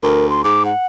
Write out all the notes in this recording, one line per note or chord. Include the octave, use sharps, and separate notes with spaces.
D2 A#4
C6
G#2 D6
F#5